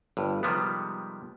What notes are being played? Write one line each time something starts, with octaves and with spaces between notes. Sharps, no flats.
G1 G2
C3 D#3 F3 G3 G#3 B3